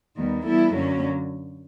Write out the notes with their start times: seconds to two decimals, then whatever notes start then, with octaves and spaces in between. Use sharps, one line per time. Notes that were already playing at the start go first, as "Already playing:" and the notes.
0.16 D#2 D#3 G3 B3
0.44 E3 G3 B3 E4 A4
0.72 F#2 D3 F#3 A#3 C#4